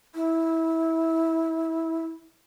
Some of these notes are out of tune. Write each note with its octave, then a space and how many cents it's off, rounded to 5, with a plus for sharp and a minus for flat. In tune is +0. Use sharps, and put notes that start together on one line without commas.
E4 -20